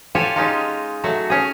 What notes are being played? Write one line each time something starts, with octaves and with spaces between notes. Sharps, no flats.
F4 G4 A4 C#5 G#5 A5
G#3 C#4 D#4 F4
F#3 A3 F#4
C#4 G#4